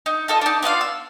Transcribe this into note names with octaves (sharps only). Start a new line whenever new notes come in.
D#4
F4 A4 D#5
D4 D#4
B3 F4 D5 F5
E6